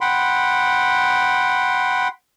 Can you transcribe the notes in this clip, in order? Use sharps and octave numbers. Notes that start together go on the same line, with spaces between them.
F#5 G5 B5 C6